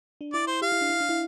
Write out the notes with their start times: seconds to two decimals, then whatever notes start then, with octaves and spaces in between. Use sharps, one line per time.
0.21 D4
0.33 E4 D5
0.47 C5
0.62 G4 F5
0.72 E4
0.81 D4
0.90 E4
1.00 D4
1.09 E4